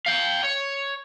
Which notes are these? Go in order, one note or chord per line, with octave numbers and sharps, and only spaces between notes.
F5 G5
C#5